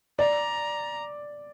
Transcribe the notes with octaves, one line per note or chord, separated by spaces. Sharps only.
D5 A#5